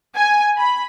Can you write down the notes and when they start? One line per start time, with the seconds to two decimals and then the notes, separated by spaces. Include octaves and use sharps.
0.16 G#5
0.58 B5